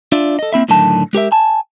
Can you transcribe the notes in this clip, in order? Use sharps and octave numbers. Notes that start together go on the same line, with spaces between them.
D4 F4 D5 E5
A4 D#5
A#3 C4 E4 E5
A2 D3 D#3 F#3 A5
G#3 G4 A#4 E5
G#5 A5